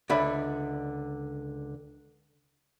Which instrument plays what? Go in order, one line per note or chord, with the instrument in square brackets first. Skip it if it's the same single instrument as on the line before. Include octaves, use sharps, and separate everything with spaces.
[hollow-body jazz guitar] C#2 D3 D5 E5 B5